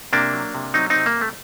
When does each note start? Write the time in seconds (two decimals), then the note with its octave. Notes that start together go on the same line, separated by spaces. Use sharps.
0.13 C3 A#3 D4
0.33 F#3
0.54 C3
0.74 F#3 C4 D#4
0.90 C4 D#4
0.95 C3
1.06 A#3
1.17 C3 A3